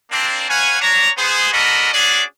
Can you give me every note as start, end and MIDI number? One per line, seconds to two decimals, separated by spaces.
0.11 0.47 58
0.11 0.47 60
0.11 0.47 62
0.49 0.79 71
0.49 0.79 73
0.49 0.79 77
0.49 0.79 78
0.49 0.79 80
0.80 1.10 62
0.80 1.10 73
0.80 1.10 82
1.17 1.51 59
1.17 1.51 68
1.17 1.51 72
1.52 1.92 62
1.52 1.92 66
1.52 1.92 69
1.52 1.92 70
1.52 1.92 75
1.52 1.92 83
1.93 2.23 61
1.93 2.23 62
1.93 2.23 66
1.93 2.23 68
1.93 2.23 74